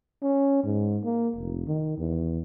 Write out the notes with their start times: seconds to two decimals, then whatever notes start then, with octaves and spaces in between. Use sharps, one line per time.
0.23 C#4
0.64 G#2
1.04 A#3
1.36 F1
1.67 D#3
1.98 E2